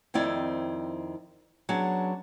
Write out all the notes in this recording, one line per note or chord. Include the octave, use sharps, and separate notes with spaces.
F2 D#3 C4 E4 D5
F#3 B3 C#4 D4 G#4